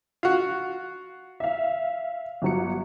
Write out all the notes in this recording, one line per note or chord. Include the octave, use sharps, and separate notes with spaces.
F4 F#4
E5 F5
G1 F#3 C#7